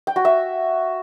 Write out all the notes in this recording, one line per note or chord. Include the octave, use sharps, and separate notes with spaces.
G5
F#4
E5